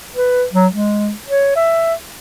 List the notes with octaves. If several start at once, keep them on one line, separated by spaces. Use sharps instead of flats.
B4
F#3
G#3
C#5
E5